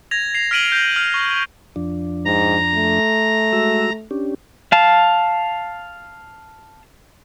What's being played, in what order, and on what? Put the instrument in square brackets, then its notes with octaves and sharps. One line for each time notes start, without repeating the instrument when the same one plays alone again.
[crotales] G#6 A#6 F7
C7 F7
F6 B6 D7 D#7 F#7 G7
G6 D7
F6
C#6
[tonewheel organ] F2 F3 D4
[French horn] G#2 [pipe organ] A#5
[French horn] A3
[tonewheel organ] G#3 F#4 E6
C#4 D4 G4
[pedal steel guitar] F5 A5